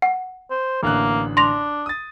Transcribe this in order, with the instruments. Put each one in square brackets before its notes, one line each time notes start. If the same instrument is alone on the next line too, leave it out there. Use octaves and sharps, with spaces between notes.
[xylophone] F#5
[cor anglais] C5
[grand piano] A1 D3 F#6 [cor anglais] A#3
[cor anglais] D4 [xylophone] C6 A#6 F7
[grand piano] D#6 A6